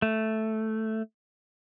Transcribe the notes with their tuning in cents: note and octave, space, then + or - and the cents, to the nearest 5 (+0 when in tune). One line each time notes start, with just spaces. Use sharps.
A3 +0